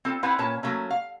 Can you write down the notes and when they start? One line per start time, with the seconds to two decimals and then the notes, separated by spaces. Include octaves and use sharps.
0.05 C4 F4 A4
0.23 C4 E4 B4 F#5 G#5
0.38 A#2 C#4 B4 C#5 A5
0.63 F#3 A3 A#3 C#4
0.90 F5